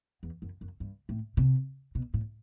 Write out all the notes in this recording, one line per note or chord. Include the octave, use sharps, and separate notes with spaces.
E2
F#2
F#2
G2
A2
C3
B2
A2